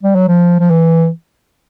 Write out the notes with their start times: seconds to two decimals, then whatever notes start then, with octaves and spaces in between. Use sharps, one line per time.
0.03 G3
0.15 F#3
0.28 F3
0.60 F3
0.70 E3